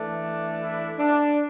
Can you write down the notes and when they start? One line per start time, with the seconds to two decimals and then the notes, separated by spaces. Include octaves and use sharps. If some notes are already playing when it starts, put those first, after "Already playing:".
Already playing: E3 A3 D4
0.59 E4
0.99 D4